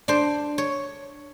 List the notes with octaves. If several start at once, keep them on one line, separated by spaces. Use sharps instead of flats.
D4 C5
C#5